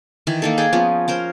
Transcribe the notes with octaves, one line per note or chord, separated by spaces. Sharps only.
D#3 E3
A#3 D#4 A4
G#4 D5 G5
F3 B3 C#4
C#4 A#4 C5